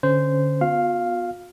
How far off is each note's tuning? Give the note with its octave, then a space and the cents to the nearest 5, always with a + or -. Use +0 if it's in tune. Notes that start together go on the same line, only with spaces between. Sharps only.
D3 +0 C#4 +0 C5 -15
B3 +0 F4 +45 F5 +0